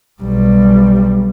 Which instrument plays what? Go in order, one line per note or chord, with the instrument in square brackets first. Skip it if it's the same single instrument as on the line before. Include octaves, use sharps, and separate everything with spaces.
[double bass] B1 G3